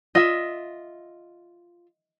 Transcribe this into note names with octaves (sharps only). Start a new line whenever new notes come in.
F4 D#5 E5